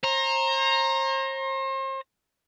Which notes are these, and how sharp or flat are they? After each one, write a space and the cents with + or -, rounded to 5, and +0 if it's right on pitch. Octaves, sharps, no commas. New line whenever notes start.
C5 +40 A#5 +0